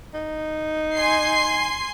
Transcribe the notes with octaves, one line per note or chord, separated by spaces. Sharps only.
D#4
G#5 C6 C7